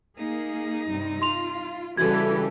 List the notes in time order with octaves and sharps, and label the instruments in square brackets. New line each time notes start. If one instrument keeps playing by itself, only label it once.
[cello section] A#3 G#4 [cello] D#4
[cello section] G2 C3 G3
[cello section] F4 [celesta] C6 F7
[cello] C#3 G3 [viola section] E3 A4 [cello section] C#4 G4 [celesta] F#4 G#6